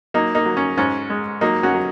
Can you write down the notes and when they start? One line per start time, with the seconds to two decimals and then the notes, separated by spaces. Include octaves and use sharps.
0.14 F#3 A#3 D#4
0.35 A#3 D#4
0.46 F#3
0.57 C#4
0.77 G#2 C#4
1.10 G#3
1.41 F#3 A#3 D#4
1.63 C#4 F#4
1.74 F#3